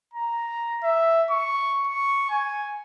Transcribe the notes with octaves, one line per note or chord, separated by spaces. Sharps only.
A#5
E5
C#6
C#6
G#5